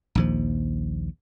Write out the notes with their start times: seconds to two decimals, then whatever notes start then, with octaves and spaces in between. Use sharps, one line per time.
0.15 A#1 D#2 F3